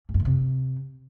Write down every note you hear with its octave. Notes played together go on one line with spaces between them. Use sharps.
G2
F#2
D#3
C3